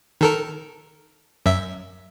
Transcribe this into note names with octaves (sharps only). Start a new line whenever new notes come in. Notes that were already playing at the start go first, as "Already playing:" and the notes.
D#3 A4 A#4
F#2 E5